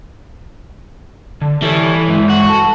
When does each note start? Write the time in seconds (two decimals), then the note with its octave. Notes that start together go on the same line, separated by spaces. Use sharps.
1.41 D3
1.62 E3 G3 A4 C#5
2.08 G2 G#3 E5
2.30 F#4
2.48 A4